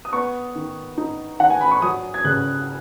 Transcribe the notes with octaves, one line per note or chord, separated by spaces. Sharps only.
D#6
B3 C#6
D#3
D#4
D#3 F#5
G#5
B5
C#6
F#3 D#6
G#6
C#3 F#6